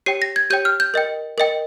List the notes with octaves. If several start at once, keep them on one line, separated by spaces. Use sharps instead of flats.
G4 C#5 G5 C7
A#6
G#6
G4 C#5 G5 G6
F6
G6
A#4 D#5 G5
A#4 D#5 G5